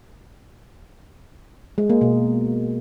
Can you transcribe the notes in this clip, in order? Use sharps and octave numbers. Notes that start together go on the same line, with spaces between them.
G#3
A#3
B2